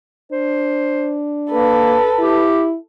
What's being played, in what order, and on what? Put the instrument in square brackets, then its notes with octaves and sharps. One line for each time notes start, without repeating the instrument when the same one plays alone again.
[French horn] D4 [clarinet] C5
[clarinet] A#3 [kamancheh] A4 B4
[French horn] E4 [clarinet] G4